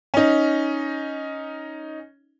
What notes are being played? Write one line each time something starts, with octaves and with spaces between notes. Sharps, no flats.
C#4 D#4